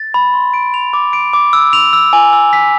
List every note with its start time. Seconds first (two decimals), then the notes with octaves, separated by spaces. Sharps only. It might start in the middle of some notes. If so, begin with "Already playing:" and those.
Already playing: A6
0.14 B5
0.34 C6
0.54 D7
0.74 F7
0.93 D6
1.13 D7
1.33 D6
1.53 E6
1.73 F7
1.93 E6
2.13 G#5
2.33 E6
2.53 B6